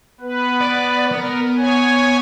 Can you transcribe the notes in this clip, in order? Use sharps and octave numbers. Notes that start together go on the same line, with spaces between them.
B3 B4
D5
B3 A#4
C#5 G#5